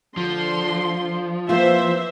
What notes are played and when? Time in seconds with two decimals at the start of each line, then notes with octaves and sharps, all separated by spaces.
0.17 D3 F3 C6
1.49 E3 A#3 C4 F4 C5 E5